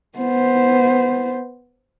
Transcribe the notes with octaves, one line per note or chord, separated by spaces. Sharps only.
B3 C5